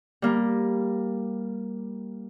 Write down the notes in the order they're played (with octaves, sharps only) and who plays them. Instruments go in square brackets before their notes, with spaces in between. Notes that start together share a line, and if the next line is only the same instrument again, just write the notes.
[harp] G3 A#3